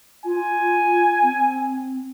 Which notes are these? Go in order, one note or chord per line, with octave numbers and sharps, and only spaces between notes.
F4 G#5
C4